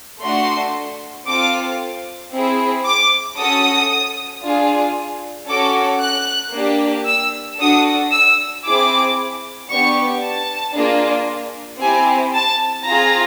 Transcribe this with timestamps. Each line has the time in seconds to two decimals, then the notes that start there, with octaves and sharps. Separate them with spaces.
0.23 A3 D4 F#4 C6
1.28 C4 F4 A4 D6
2.33 C4 E4 G#4
2.86 D6
3.38 C#4 F#4 A4 D#6
4.44 D4 F4 G#4
5.49 C#4 F#4 A4 D6
6.01 F#6
6.55 A#3 D4 G4
7.07 E6
7.59 D4 F#4 A4 D#6
8.12 E6
8.65 C4 E4 G#4 D6
9.71 B3 D4 G4 C#6
10.22 A5
10.75 A#3 D4 F4 G#4
11.81 C4 E4 G4 G#5
12.34 A5
12.86 C4 F4 G#4 A#5